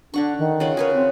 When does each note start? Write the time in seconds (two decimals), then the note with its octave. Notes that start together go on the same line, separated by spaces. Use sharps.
0.14 D3 D4 F#5 C#6
0.39 D#3
0.60 C#3 F4 F#5
0.77 G#4 A#4 B4 C#5
0.94 C4